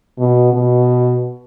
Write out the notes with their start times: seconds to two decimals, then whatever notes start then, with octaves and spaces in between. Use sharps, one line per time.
0.18 B2
0.53 B2